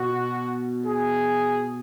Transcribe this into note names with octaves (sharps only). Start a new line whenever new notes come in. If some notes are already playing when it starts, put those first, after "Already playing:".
Already playing: B2 F#4
G#4